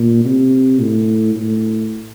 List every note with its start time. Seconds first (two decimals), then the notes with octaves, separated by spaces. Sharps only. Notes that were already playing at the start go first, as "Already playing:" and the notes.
Already playing: A#2
0.25 C3
0.81 A2
1.36 A2